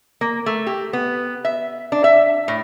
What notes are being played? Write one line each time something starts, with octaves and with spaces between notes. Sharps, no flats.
A#3
A3
G4
B3
E5
D4
E5
A2